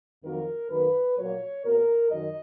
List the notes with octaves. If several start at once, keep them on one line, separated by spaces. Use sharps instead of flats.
F2 D#3 F#3 A#3 A#4
F#2 D#3 A#3 B4
A#2 F#3 A#3 C#5
B2 A#3 A#4
F#2 D#3 D#5